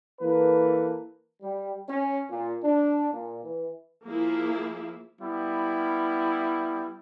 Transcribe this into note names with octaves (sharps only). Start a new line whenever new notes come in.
E3 A#3 A4 B4
G3
C#4
A#2
D4
A#2
E3
F3 A#3 E4 G#4
G3 B3 E4